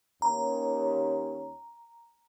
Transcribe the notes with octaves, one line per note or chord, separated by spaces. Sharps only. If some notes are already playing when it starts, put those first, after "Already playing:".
D#2 C#4 A#5